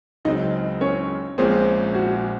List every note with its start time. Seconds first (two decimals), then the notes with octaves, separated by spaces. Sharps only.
0.25 C#2 C#3 F#3 C4 D#4 D#5
0.81 C#4 C#5
1.38 A#1 A#2 G#3 C4 C#4 G#4 C5
1.94 F#4